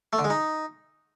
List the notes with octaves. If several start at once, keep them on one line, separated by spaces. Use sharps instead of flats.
A3
D3
G#3
D#4